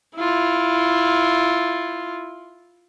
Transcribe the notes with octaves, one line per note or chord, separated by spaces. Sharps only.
E4 F4